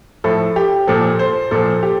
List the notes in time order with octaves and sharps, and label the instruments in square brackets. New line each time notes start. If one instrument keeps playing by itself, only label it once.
[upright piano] A2 F3 A4
G4
A#2 F3 A4
C5
A#2 F3 A4
G4